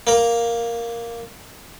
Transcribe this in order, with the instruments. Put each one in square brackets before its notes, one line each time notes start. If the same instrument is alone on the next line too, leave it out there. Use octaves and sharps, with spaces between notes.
[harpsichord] A#3 A#4